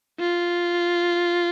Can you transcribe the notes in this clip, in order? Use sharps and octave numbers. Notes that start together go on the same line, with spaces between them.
F4